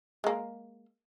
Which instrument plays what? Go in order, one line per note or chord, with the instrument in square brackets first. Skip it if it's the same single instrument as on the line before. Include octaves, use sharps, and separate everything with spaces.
[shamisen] G#3 A#3